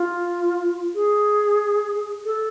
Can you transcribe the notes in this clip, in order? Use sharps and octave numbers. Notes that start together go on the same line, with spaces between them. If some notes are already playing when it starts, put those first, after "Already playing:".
Already playing: F4
G#4
A4